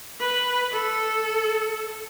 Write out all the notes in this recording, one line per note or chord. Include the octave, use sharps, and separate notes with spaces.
B4
A4